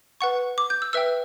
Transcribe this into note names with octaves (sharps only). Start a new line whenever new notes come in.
B4 F#5 C#6
D6
G6
E6
B4 E5 G5 E6